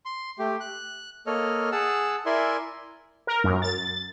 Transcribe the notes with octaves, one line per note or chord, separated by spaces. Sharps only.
C6
A3 G4
F#6
A#3 A4 C#5 D#5 F6
G#4 F#5 A5 E6
E4 A#4 D5 E5 G#5 C6
A#4
F#2
A6